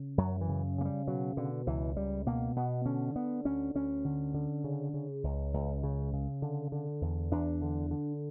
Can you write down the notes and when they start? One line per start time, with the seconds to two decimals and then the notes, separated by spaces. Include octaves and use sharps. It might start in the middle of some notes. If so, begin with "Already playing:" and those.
Already playing: C#3
0.18 F#2 F#3
0.41 E3
0.48 C#3
0.78 C#3 A#3
0.85 G3
1.07 B2 F#3
1.37 B2 D3
1.67 C#2 E3
1.96 C#2 G3
2.26 B2 A#3
2.56 B2 B3
2.86 D3 C#4
3.15 D3 B3
3.45 D2 C#4
3.75 D2 C#4
4.04 D3
4.34 D3
4.64 C#3
4.94 C#3
5.24 C#2
5.54 C#2
5.83 C#3
6.13 C#3
6.42 D3
6.72 D3
7.01 E2
7.32 E2 D4
7.62 D3
7.91 D3